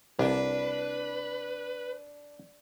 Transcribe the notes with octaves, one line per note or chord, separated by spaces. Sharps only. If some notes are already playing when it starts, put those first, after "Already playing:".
C2 D4 B4